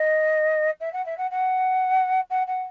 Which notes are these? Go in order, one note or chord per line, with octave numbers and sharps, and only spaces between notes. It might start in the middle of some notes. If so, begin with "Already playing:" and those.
Already playing: D#5
E5
F#5
E5
F#5
F#5
F#5
F#5